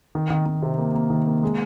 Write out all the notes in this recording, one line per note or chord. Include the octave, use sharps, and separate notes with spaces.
D#3
D#3
D#3
C3
A#3
A#3
D#3
A#3
G#3